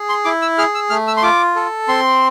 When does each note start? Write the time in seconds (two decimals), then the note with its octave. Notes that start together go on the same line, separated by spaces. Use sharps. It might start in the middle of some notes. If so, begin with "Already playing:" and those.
Already playing: G#4
0.09 C6
0.25 E4 D6
0.42 E6
0.58 G#4 F6
0.75 E6
0.90 A3 F6
1.07 E6
1.17 C6
1.23 F4 D6
1.56 A4
1.88 C4 C6